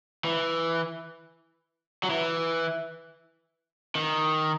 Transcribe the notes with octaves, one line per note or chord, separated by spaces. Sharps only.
E3
F#3
E3
D#3